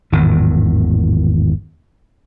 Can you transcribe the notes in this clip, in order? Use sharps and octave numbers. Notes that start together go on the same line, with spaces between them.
G#1 E2 A2 D#3